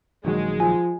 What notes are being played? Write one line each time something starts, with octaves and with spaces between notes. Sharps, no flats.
A#1 D#3 F#3 G#3
F3 G#5